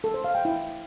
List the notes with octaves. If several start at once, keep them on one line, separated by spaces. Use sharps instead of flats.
A4
C5
F5
G5
E4